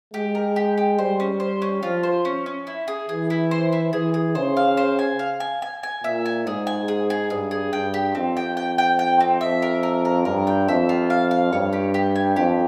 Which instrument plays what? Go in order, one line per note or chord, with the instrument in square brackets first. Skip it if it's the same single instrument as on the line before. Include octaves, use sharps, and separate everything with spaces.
[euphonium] G#3 [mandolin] G4
[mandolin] A#4
G4
G4
[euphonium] G3 [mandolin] C5
[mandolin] C#4
C5
C#4
[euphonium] F3 [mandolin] F4
[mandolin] C5
C#4
C#4
E4
G#4
[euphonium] E3 [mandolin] G#4
[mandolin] E4
C5
E4
[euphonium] E3 [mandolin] G#4
[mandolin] G#4
[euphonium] C#3 [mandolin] C5
[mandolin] F5
C5
G#5
F5
G#5
G#5
G#5
[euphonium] A#2 [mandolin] E5
[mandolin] G#5
[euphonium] G#2 [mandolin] G#4
[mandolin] G#5
G#4
G#4
[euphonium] G2 [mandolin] G#4
[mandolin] G#4
[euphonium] G2 [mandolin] G5
[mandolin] G4
[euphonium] F2 [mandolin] C4
[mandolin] G5
G5
G5
G5
C4
[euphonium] F2 [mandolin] E5
[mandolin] A#4
A#4
A#4
[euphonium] G2 [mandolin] A#4
[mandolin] G5
[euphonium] F2 [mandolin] E5
[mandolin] F4
F5
F5
[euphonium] G2 [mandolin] C#5
[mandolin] G4
G4
G#5
[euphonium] F2 [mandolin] G4